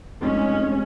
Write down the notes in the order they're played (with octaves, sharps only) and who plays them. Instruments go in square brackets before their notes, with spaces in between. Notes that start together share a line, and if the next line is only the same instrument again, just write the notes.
[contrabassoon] F1 [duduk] G#3 [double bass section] C#4